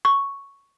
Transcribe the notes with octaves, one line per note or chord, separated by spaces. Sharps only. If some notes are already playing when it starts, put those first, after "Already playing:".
C#6